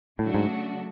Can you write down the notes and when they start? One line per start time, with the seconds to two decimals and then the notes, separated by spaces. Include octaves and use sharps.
0.19 A2 C#3 F#3 A3 D4 F#4
0.34 G#2